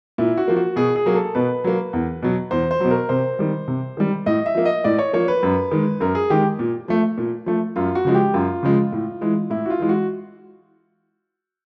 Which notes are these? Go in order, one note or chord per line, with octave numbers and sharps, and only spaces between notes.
A#2 E4
F#4
F3 A#3
F#4
B2 G#4
G#4
F#3 A#3
A4
B2 B4
F#3 A#3
E2
B2 F#3
E2 C5
C5
B2 F#3
A#4
C3 C5
D#3 G3
C3
D#3 G3
A2 D#5
E5
F3 A#3
D#5
A2 D5
C#5
F3 A#3 C#5
B4
F#2
D#3 G#3
F#2 A#4
G#4
D#3 G#3 G4
A#2
F3 A3
A#2
F3 A3
F#2 F4
F#4
C#3 F3 G#3
G4
F#2 F4
C#3 F3 G#3
A2
E3 G#3
A2 E4
F#4
F4
E3 G#3
F#4